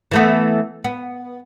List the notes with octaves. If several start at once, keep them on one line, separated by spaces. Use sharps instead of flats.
E3 A3 B3
B3